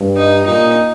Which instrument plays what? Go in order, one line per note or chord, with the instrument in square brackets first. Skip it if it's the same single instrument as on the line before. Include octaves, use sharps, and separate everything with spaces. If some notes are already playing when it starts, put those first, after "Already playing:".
Already playing: [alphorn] G2
[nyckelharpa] D#4
[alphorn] A#2 [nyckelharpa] D#4